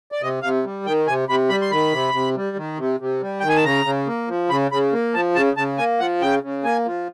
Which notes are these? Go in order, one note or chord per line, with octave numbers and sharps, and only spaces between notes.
D5
C3 D#5
C3 F5
G3
D#3 G5
C3 G#5
C3 B5
G3 B5
C6
D#3 B5
C3
C3
G3
D#3
C3
C3
G3
G5
D#3
G#5
A5
C#3 A#5
C#3
A#3
F3
C#3 B5
C#3 B5
A#3
F3 A5
C#3 A5
C#3 A5
A#3 G#5
F3 F#5
C#3 G5
C#3
A#3 G#5
F3